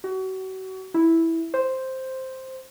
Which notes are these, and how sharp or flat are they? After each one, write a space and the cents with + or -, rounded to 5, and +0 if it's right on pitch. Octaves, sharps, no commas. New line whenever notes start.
F#4 +35
E4 -5
C5 +0